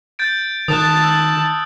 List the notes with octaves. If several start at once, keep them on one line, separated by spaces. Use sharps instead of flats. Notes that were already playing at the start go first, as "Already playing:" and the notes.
G6 A6 D7
D#3 A5 D#6 F#6
E6